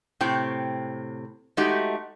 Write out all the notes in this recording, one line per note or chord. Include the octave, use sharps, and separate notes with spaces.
A2 C3 C4 G5
G#3 A3 D#4 F#4 G4